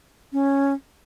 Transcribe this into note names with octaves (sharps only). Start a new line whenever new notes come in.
C#4